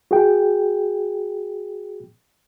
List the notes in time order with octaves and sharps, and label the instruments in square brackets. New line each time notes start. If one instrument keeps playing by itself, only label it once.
[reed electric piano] F#4 G#4 G5